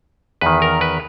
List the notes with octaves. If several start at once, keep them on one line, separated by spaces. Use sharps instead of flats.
E2 D#3 B4
A#4
B4